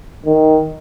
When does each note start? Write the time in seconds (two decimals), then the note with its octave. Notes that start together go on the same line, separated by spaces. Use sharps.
0.26 D#3